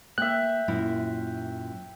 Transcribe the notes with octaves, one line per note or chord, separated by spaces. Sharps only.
A#3 E5 G5 F#6
F#2 A#2 E4